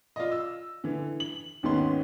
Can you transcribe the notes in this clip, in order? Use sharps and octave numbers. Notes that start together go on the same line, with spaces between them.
F4 D5 D#5
E6
D3 E3
F#7
D#2 G#2 D#3 B3 C#4 C6